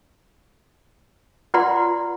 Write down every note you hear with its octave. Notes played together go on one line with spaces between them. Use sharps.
F4 B4 D5 F#5 A#5 C6